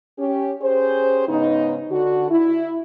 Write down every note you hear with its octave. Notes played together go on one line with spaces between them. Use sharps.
C#4 G4
C#4 G4 G#4 C5
G#2 C#3 B3 D#4
D3 F#4
E4